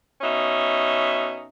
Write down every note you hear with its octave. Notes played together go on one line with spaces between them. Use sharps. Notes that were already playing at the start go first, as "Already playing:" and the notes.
B2 C#4 D#4 E5